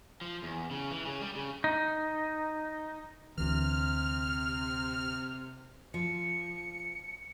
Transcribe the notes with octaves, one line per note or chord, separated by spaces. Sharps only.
F3
E2
C#3
E3
C#3
G3
C#3
D#4
D2 C3 E3 F6
F3 C#7